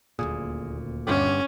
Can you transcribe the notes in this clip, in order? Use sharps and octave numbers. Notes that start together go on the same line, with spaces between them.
D#1 D2 A#2 G#4
G1 G2 C#4 G4